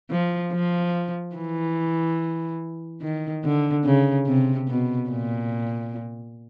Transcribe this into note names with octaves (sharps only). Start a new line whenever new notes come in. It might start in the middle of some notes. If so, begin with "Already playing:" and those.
F3
F3
E3
D#3
D3
C#3
C3
B2
A#2